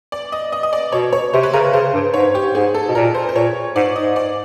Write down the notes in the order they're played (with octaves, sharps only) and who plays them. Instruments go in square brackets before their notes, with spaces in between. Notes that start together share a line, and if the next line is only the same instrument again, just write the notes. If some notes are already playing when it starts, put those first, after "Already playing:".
[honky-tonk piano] D5
D#5
D#5
D#5
D5
[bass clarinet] B2 [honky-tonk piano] C#5
[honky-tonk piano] C#5
[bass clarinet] C3 [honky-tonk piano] C5
[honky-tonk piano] B4
[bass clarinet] C#3 [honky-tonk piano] A#4
[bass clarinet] C#3 [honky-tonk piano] C5
[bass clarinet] G2
[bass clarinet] G#2 [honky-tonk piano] C#5
[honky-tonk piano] G4
[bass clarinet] G#2 [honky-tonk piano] G#4
[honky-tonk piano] A4
[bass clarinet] B2
[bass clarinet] A#2 [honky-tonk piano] A#4
[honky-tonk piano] C5
C5
[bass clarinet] A#2 [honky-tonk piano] C#5
[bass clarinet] G#2 [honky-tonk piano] D5
[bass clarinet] G#2 [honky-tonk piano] D#5
[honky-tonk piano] D5